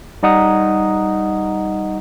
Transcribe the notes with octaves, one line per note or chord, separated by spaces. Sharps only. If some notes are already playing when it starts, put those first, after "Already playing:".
G3 D#4 D#5 F#5 A#5 D#6